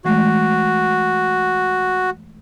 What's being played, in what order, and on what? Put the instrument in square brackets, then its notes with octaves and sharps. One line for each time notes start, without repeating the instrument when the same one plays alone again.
[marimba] E3 G#3 A3 [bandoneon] F#4